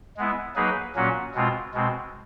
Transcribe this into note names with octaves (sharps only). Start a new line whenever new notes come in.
G#3 B3 E4
F#3 A#3 D#4 G#4 B4
A#2 F#3 A#3 C#4 F#4
B2 G#3 C4 F4
B2 G#3 C4